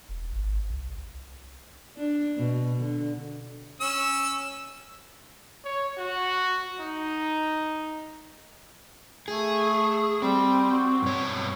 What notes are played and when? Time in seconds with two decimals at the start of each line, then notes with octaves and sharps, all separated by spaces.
0.09 E1
0.32 G#1
0.70 C2
1.96 D4
2.37 B2
2.80 D3
3.81 C#4 E6
5.65 C#5
5.98 F#4
6.81 D#4
9.28 A3 G#4
10.22 G3 C4
10.71 F#4
11.02 G2 B2 C#5